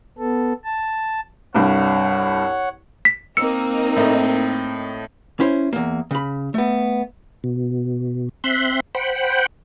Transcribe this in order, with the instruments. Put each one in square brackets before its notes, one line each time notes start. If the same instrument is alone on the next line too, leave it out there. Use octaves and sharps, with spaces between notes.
[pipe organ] B3 A4
A5
[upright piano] C2 G2 [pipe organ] C#5 F#5
[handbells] B6
[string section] A#3 D#4 [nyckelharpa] C4 [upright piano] E6 [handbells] C#7
[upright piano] A2 A3 D#5
[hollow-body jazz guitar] C#4 E4 C5
E2 A#3
C#3 B5
A3 B3
[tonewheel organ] B2
C4 E5 C6 F#6
C5 F#5 G5 B5